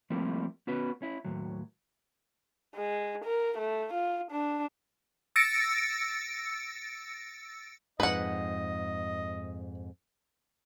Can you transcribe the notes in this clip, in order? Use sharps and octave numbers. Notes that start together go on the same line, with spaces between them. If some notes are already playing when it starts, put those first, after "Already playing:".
F3 G3 A3 A#3 C4 E4
B3 C#4 F#4 B4
C#4 E4
D#2 A2 F#3
G#3
A#4
A3
F4
D4
E6 A6 A#6 C#7 D7
F2 G#2 B4 D#5 F#5